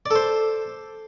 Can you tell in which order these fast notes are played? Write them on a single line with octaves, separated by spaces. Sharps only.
D5 A4 C5